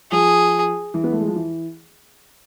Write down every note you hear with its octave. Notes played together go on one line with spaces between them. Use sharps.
F3 G#4
E3
B3
A3
G#3
F3
E3